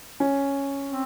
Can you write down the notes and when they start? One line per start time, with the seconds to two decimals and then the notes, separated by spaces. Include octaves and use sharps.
0.20 C#4
0.90 C4